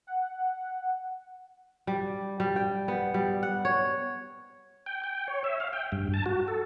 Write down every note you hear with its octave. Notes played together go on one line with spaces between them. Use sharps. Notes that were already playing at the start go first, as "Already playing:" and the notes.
F#5
G3
G3
G5
B3
G3
F#5
C#5
G5
G5
C#5
E5
F5
G5
G2
A5
F#4
A4